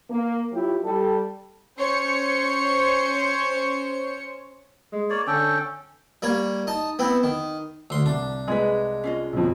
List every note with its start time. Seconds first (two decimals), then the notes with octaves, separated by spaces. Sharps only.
0.10 A#3
0.52 F#3 E4 F4 G4
0.84 G3 G4 A4
1.77 C#4 C5 C#5 C#7
4.93 G#3
5.10 A#3 C#5 D5
5.27 D3 C#4 A4 G5
6.22 G3 A#3 C#5
6.67 D#4 A5
6.99 B3 C4 E4
7.23 D#3
7.90 D2 C6
8.06 C2 D4
8.48 G#3 G#4 B4
9.04 C#4 F4 D#5
9.33 B1 F2